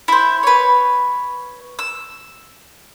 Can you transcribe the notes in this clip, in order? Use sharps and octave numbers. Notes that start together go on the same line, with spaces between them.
E4 C5
B4 C#5
E6